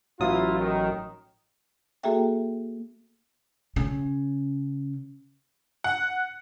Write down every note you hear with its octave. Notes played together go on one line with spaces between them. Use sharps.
A1 F#3 E4 F4 D#6
D#3
A#3 F#4 G#4 A4 E5 G5
C#3 C#4
F#5